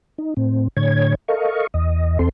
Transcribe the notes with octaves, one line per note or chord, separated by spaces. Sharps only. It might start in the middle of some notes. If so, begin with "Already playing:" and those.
D#4
A2 C4
A2 D3 C#5 G#6
A4 A#4 D#5 F5 C#6
E2 D#5
E2 C4 A4 C6